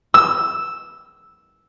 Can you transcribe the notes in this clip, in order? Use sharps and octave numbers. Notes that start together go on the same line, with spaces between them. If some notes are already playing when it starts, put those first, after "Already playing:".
E6